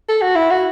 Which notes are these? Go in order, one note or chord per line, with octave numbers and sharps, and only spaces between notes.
A4
F#4
E4
F#4